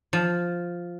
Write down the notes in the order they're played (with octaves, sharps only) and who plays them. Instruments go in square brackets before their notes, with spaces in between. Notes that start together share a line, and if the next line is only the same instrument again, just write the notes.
[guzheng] F3